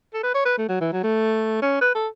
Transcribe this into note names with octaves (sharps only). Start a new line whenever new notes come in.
A4
B4
C#5
B4
A3
F#3
E3
F#3
A3
C#4
B4
A4